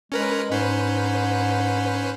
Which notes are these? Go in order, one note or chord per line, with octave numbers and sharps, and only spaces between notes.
G#3 C#4 A#4 B4
G#2 C#4 B4 C5